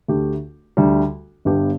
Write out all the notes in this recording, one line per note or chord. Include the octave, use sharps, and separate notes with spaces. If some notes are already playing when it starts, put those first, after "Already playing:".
D2 D3 A3 G4
D2 D3 G3
G1 G2 D3 B3 G4